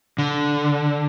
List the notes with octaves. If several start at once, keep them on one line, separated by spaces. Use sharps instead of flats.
D3